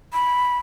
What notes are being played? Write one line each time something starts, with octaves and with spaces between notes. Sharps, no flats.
B5